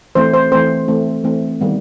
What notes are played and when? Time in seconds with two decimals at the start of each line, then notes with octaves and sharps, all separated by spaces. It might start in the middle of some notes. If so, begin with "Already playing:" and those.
0.15 E3 A3 C4 C5
0.34 C5
0.52 E3 A3 C4 C5
0.88 E3 A3 C4
1.24 E3 A3 C4
1.61 D#3 G3 B3